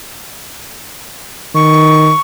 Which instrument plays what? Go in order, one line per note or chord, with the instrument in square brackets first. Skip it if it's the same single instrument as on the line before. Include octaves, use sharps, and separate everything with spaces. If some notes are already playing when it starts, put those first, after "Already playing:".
[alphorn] D#3 [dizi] C#6